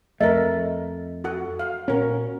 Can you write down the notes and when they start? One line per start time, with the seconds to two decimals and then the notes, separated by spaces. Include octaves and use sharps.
0.21 F2 A3 A#4 D#5 E5
1.24 F#4 A4 F#5
1.59 F5
1.88 A#2 C#4 F#4 A#4